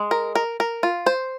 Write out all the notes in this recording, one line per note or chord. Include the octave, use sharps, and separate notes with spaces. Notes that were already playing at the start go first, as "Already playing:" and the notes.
Already playing: G#3
A#4
A#4
A#4
F4
C5